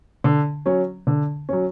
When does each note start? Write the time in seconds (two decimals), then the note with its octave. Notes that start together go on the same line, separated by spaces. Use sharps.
0.24 D3
0.66 F#3 C#4
1.07 D3
1.49 F#3 C#4